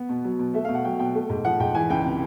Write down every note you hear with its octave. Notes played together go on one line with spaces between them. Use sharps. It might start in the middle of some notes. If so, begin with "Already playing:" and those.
Already playing: B3
B2
F#3
B2
A3 E5
F5
B2
F#5
F#3 G5
B2 G5
A3
G#2
F3 F#5
G#2 G5
E3 G#5
C#2 G5
C3